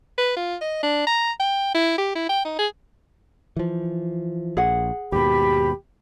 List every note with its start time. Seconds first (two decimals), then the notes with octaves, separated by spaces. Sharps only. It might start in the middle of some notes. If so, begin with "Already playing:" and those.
0.18 B4
0.37 F4
0.61 D#5
0.83 D4
1.07 A#5
1.40 G5
1.75 E4
1.98 G4
2.15 E4
2.29 G5
2.45 D#4
2.59 G#4
3.56 E3 F3
4.57 A#1 G#4 F#5
5.12 D#2 G#2 B2 G4 B5